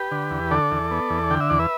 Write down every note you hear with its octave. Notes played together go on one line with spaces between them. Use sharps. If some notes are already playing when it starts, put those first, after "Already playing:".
Already playing: G4 B4
D3
E2
D3 A4 D5
E2
B3
E2
D3 G5
E5
E2 D5
B4 E5